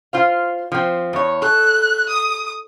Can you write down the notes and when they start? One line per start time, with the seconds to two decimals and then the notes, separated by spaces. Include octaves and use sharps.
0.13 F4 C5 F5
0.72 F3 C4
1.13 E2 C#5
1.42 A4 F#6
2.09 D#6